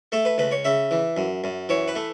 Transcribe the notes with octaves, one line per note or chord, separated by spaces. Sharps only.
A3 A4
B4
C#2 B4
C#5
C#3 E5
E3
F#2
F#2
E3 C#5
B4
A3